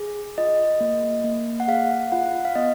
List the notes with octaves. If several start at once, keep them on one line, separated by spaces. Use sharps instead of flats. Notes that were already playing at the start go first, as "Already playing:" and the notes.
Already playing: G#4
F4 D#5
A#3
A#3
F#5
G#4 F5
F4 F#5
F5
B3 D#5